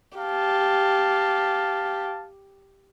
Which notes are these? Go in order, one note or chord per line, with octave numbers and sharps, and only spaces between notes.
G4 F5 A5